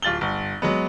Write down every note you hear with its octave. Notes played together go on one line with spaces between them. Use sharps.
D1 F4 A6 F#7 G7
G1
F#3 G#3 B3